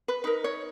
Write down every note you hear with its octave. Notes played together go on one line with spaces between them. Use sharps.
B4
D#4 A#4 B4
C#5